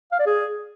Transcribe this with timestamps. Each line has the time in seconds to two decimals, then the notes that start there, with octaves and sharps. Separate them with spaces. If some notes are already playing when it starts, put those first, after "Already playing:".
0.12 F5
0.19 D5
0.26 G#4